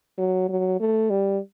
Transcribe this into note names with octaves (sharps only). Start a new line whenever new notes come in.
F#3
F#3
A3
G3